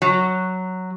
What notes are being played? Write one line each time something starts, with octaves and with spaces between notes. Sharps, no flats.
F#3